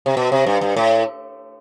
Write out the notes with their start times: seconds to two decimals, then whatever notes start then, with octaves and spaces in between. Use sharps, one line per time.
0.06 C3
0.17 B2
0.32 C3
0.47 G2
0.61 G2
0.77 A2